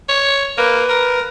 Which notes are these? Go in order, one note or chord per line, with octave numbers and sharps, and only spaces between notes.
C#5
A#3 B4
A#4